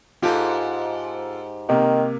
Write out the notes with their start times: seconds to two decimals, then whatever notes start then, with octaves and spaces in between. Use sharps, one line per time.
0.22 G#2 F4 G4 A4
1.69 C3 D#3 A#3